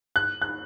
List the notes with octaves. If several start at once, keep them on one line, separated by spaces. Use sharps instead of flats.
F#6
F#6